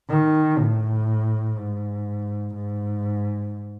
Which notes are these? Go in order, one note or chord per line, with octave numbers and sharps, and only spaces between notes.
D#3
A2
G#2
G#2